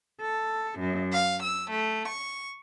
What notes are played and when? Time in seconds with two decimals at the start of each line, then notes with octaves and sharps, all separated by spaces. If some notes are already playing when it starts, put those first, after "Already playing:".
0.20 A4
0.79 F#2
1.13 F5
1.43 E6
1.73 A3
2.10 C#6